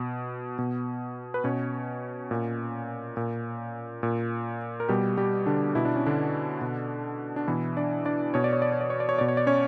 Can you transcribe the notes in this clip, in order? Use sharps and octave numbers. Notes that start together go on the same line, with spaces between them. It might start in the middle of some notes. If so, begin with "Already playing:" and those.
Already playing: B2
B2
B4
B2 C#4 C#5
A#2
A#2
A#2
A#4
B2 G3 G4
G3 G4
D3 D4
B2 E4
D4
C#4
D3 D4
B2
D4
B2 E3 E4
D4 D5
D4 D5
B2 C#5
D5
C#5
D5
C#5
D5
C#5
D5
C#5
B2 D5
C#5
D5
C#4 C#5